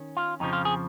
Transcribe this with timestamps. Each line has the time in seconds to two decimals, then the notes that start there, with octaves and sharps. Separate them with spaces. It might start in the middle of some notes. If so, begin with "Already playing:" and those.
Already playing: D#3 C#4
0.17 F4
0.40 F2 C#3 F3 D#4
0.53 F4
0.65 G#4